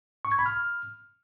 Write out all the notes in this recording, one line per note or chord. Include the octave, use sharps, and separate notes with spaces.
C#6
G#6
B5
F6